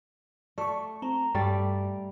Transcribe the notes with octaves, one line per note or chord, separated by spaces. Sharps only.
A3 D5 C#6
C4 A#5
G2 G3 A3 D5